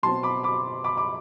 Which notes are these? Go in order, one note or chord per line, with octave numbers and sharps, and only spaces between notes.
B2 F#3 C4 A5 C6
B5 D6
B5 D6
B5 D6
B5 D6